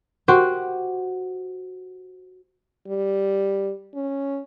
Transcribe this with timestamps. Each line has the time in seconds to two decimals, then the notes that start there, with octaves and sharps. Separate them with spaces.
0.28 F#4 G4 C5
2.88 G3
3.94 C#4